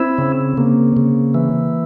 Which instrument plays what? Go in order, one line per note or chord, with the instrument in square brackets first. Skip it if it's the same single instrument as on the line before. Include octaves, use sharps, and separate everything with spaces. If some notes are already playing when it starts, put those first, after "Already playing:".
Already playing: [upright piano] C4 [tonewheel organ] E4
[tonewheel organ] C#3 [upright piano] C4
[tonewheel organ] C#3 [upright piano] A#3
[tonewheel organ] C#3
E3